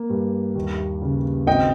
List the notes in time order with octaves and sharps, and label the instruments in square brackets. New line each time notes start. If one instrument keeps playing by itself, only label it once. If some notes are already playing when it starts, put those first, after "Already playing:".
Already playing: [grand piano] A#3
G2
D#2
C#3
G#1 D#5 G5